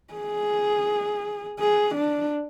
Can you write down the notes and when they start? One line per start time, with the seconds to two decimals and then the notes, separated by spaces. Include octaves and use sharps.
0.14 G#4
1.60 G#4
1.95 D4